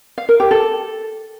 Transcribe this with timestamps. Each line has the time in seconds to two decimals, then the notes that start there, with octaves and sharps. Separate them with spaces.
0.18 F5
0.29 A#4
0.40 G4
0.51 A4